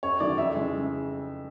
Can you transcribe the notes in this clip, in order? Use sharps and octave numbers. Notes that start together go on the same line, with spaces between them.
F#2 C#5
D#3 F#3 A3 D5
F2 E5
C#3 E3 G#3